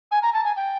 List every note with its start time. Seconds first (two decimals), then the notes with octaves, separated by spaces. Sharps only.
0.12 G#5
0.22 A#5
0.34 A5
0.45 G#5
0.56 G5